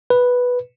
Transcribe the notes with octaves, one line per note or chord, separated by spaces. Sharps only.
B4